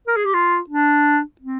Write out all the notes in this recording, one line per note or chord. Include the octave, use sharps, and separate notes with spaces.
A#4
G#4
G4
F4
D4
C4